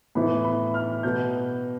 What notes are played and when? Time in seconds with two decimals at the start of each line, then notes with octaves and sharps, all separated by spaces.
0.15 A2 E3 B3 B5
0.45 B5
0.74 F6
1.03 B2 B3 G6